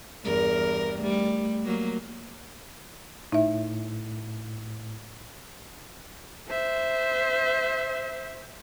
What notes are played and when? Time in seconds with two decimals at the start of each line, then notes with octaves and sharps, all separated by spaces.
0.24 E2 G2 A#4
0.99 G3 A3
1.64 F#3 A#3
3.32 A2 D#4 E5
6.49 C5 E5